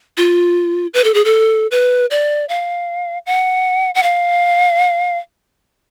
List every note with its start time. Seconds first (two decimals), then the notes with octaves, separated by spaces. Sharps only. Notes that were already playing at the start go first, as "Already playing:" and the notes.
0.17 F4
0.94 B4
1.04 A4
1.14 G#4
1.25 A4
1.71 B4
2.11 D5
2.49 F5
3.26 F#5
3.95 F#5
4.03 F5